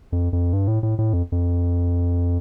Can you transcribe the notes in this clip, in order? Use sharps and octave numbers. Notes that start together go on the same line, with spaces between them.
F2
F2
G2
A2
A2
A2
F2
F2